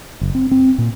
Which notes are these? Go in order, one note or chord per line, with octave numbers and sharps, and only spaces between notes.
F#1
C4
C4
A#2